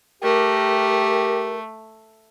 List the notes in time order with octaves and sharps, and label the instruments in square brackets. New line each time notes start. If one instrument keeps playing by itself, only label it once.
[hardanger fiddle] A3 [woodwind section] G4 A#4